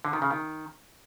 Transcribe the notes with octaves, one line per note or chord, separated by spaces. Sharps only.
D3
D#3
C#3
D#3